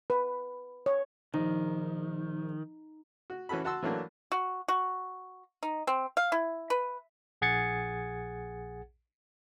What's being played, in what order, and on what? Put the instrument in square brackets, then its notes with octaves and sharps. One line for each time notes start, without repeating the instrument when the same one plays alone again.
[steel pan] B4
C#5
[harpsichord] A#1 [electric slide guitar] D#3 [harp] D#4
[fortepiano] F#4
E3 C#4 F#4 A4 B5
F#4 F#5 A5 C6 E6
E3 F#3 A3 A#3 D4
[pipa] F#4
F#4
D#4
C4
F5
E4
B4
[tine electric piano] A#1 G#4 F#5 G#6 A6 C#7